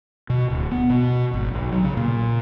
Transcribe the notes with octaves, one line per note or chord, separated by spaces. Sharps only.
B2
D1
B3
B2
G#1
B1
F#3
C#3
A#2